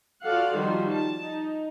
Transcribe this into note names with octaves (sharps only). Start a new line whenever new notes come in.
F4 F#4 A4 D5 F5 F#5
D#3 F3 G3 D#4 F#4 C5
A5
D#4